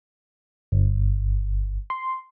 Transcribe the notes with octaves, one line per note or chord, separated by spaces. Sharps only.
G1
C6